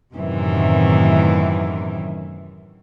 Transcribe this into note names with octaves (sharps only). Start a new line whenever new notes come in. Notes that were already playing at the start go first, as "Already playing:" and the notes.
F#2 A2 C3 D#3 E3